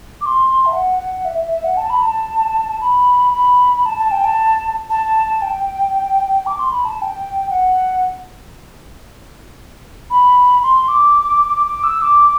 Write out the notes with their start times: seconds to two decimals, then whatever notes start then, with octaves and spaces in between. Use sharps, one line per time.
0.21 D6
0.26 C6
0.66 E5
0.73 F#5
0.99 F#5
1.25 E5
1.38 E5
1.51 E5
1.64 F#5
1.77 A5
1.90 B5
2.02 A5
2.81 B5
3.34 B5
3.85 A5
3.99 A5
4.11 G5
4.24 A5
4.90 A5
5.42 G5
6.46 D6
6.59 C6
6.72 B5
6.85 A5
6.98 A5
7.02 G5
7.50 F#5
10.10 B5
10.63 C6
10.88 D6
11.66 D6
11.84 E6
12.02 D6